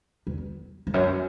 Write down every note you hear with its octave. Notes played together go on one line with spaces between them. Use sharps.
E2
F2
F#2